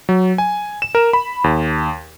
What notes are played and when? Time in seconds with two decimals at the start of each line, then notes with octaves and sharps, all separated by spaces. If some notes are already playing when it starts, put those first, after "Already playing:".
0.09 F#3
0.38 G#5
0.82 E7
0.95 A#4
1.13 B5
1.44 D#2